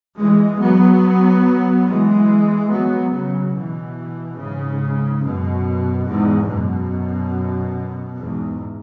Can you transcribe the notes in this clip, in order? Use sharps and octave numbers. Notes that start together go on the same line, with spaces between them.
E3 G#3
F#3 B3
E3 G#3
F#3 B3
C#3 F#3
B2 E3
G#2 C#3
F#2 B2
E2 G#2
F#2 B2
E2 G#2